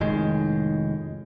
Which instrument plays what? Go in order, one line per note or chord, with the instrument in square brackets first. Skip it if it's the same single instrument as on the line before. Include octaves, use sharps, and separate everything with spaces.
[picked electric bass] F1 A2 D#3 G#3